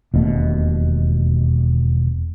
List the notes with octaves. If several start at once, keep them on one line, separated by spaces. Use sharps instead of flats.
E1 D#2 B2 A3